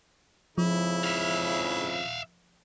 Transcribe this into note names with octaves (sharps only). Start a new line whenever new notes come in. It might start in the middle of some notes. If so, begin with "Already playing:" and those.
F2 G#2 C#3 F3 E4
E5 F5